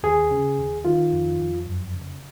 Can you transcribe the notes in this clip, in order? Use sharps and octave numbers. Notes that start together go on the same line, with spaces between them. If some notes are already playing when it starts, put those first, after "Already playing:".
D#2 G#4
C#3
D#2
D#3 F4
F2
F2
F#2
C#3